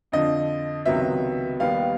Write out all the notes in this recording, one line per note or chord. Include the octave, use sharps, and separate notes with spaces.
F2 D3 F3 D#5
C#2 C3 D#3 F#3 B3 E5
D#2 D#3 G3 B3 F5